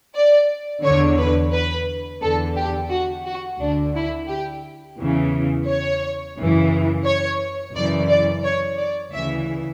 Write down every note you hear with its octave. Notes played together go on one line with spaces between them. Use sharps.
D5
E2 D3 C#5
B4
B4
E2 D3 A4
G4
F#4
F#4
D2 D3 D4
E4
G4
E2 C#3 E3
C#5
F#2 C#3 E3
C#5
F#2 C#3 E3 D5
D5
C#5
D5
D2 C#3 E3 E5